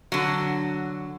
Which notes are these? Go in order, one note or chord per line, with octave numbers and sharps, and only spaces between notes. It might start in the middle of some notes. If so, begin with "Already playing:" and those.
D3 F#3